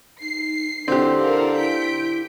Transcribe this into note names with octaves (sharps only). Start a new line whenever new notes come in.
D#4 C7
D3 C4 E4 G4
A4 A#4 F5
E4 G6 B6 D7